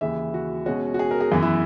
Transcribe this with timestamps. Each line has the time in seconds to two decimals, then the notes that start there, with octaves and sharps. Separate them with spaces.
0.01 D#2 C#3 E3 E5
0.34 F#4
0.66 B2 G#3 C#4 F#4
0.94 F#4
0.99 G#4
1.11 A#4
1.21 G#4
1.32 F#2 E3 B3 F#4
1.42 E4